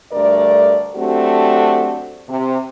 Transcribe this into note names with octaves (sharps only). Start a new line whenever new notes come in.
D2 G2 A3 A#4 D5
F#3 A3 C4 D4 F#4 G4
C3